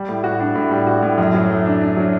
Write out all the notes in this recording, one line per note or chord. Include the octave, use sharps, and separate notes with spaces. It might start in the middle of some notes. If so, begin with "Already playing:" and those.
Already playing: G3
A2
F#4
D4
A2
G3
F#4
A2
F#2
F#3
A3
D4
D4
F#3